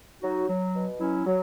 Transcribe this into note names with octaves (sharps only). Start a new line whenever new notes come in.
F#3 D#4 F#4
F#3
B2
F#3 C#4 E4
F#3